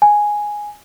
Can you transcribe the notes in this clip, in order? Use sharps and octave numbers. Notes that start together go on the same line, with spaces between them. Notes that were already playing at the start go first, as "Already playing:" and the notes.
G#5